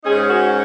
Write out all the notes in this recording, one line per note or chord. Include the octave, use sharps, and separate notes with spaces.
G#2 G#3 C#4 D#4 G#4
C#5
F#4 A#4